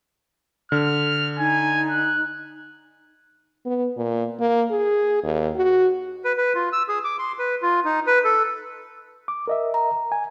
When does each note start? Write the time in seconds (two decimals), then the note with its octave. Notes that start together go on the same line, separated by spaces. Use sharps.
0.72 D3 F6
1.38 D#4 G#5
1.90 F#6
3.66 B3
3.97 A#2
4.39 A#3
4.71 G#4
5.23 D#2
5.56 F#4
6.24 B4
6.38 B4
6.55 F4
6.73 E6
6.88 G#4
7.04 D6
7.19 C6
7.39 B4
7.62 F4
7.85 D#4
8.07 B4
8.25 A4
9.28 D6
9.48 A#4 D#5 E5
9.74 A#5
10.12 G#5